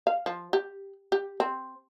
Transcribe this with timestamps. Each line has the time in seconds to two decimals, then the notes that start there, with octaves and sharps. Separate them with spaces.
0.07 F5
0.26 F3
0.53 G4
1.12 G4
1.40 C4